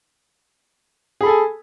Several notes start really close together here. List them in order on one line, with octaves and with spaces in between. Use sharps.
G#4 B5 A4 G#5